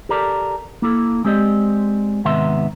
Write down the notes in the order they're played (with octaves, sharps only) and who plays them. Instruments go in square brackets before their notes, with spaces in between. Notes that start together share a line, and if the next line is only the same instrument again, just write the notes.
[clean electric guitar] G4 A4 A#4 D5
A#3 E4 A4
G#3 C4 G4 D5 D#5
G#2 C3 D#3 B3 E5 C6